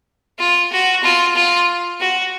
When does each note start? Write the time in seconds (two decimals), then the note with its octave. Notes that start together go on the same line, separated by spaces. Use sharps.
0.39 F4
0.72 F#4
1.03 F4
1.36 F4
2.00 F#4